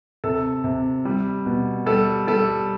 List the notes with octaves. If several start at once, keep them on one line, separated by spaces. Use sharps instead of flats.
C3 A4
C3
G3
B2
G3 A4
G3 A4